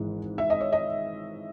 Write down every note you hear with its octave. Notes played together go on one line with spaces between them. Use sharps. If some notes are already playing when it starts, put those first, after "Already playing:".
Already playing: G#1 G#2 E3 G#3
E5
D#5
C#5
D#5